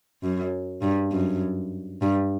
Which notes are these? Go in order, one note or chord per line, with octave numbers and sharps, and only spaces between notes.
F#2
G2
F#2
G2